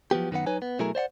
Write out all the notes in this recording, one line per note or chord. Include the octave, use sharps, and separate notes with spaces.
F3 F#3 B3 G4
F#2 D#3 B3 B4 F#5
F#3 D#4 B4 C#5 G#5
B3
B2 F#3 A3 E4 G#4 A#4
C5 D5 F5 F#5